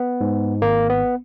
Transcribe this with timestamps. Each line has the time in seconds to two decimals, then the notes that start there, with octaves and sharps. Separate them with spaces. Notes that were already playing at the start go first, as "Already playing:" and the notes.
Already playing: B3
0.21 G#2
0.62 G#1 A#3
0.90 B3